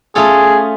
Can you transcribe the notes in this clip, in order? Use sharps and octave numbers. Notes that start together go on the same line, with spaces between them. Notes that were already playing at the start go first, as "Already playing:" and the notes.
A3 C#4 F4 G#4 A4 C#5